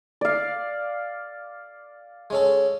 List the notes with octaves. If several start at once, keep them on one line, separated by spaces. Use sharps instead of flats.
D5 F5
G#3 C#4 A4